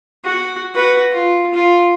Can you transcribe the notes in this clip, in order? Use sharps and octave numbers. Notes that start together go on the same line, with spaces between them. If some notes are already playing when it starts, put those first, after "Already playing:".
F#4
F#4 B4
F4
F4